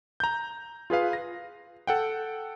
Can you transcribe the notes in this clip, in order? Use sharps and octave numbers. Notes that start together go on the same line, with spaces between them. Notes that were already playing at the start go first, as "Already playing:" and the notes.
A#5 G6
F4 G#4 B4 F5
A#6
A4 F#5 G5